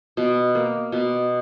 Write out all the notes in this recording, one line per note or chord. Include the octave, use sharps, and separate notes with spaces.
B2
A#3
B2